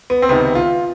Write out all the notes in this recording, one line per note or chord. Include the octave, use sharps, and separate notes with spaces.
B3
C4
C#2 C3 D#3 B3
F4